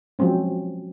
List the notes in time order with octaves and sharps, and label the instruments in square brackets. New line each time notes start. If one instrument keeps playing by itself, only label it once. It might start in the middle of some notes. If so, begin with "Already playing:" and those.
[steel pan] F3 F#3 G#3 C4 C#4